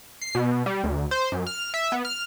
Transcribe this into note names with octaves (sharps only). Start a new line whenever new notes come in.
C7
B2
G3
D2
C5
F#2
F6
E5
B3
F6